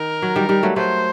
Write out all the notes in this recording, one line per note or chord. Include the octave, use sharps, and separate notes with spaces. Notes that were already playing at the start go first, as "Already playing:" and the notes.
Already playing: D#3 A#4
F#3
D#3 G3
D#3 G3
F#3 A3
F#3 A3 C5